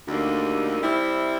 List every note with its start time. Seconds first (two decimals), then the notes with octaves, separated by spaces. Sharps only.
0.08 D2 D3 G3 A#3 D#4
0.82 G3 C4 E4